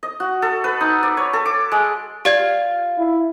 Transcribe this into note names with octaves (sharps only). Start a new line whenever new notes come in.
D#5
F#4
A4
B4
D#4
D5
C#5
A4
D6
G#3
F4 G4 D5 G#6
E4